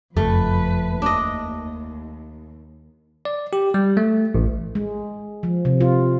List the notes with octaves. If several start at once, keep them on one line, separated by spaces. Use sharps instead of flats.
F#1 F2 F3 A3 B4
D#2 D4 D#5
D5
G4
G3
A3
A1
G#3
F3
C3
F4